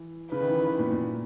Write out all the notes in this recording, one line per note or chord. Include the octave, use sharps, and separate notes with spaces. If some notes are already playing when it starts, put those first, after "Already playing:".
Already playing: E3
C#3 B4
D#3
E3
D#3
E3
A#2
A#2